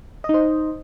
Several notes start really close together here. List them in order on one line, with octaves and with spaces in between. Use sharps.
D#5 D#4 C5